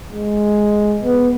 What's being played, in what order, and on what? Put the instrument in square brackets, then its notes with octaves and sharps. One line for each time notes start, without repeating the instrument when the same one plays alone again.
[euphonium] G#3
B3